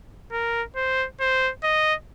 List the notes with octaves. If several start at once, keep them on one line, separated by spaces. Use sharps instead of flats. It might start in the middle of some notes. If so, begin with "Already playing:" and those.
A#4
C5
C5
D#5